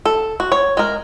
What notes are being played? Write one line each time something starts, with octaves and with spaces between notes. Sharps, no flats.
A4
F#4
C#5
G#3 A#4